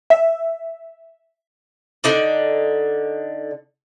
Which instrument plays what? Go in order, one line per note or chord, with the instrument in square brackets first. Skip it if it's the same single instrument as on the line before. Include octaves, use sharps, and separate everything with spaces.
[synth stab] E5
[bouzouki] D3 D#4 D5